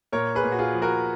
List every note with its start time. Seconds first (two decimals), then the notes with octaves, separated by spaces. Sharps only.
0.12 A#2 A#4 C#5
0.35 G#4 B4
0.44 A#2
0.52 F#4
0.59 F4 G#4
0.74 F3
0.82 F#4 A#4